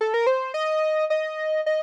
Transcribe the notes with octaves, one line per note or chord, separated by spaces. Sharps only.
A4
A#4
C5
D#5
D#5
D#5